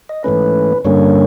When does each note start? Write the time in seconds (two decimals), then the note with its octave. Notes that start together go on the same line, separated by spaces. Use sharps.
0.09 D#5
0.24 G#2 E3 A3 C#4 B4
0.85 G2 D3 G3 A#3 C#4 C#5